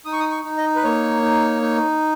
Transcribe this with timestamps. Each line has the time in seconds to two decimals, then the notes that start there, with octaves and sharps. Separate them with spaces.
0.05 D#4 D#6
0.13 C#6
0.20 D#6
0.31 C#6
0.45 D#4
0.58 D#5
0.76 B4
0.84 A#3 C#5
1.22 D#4
1.62 D#4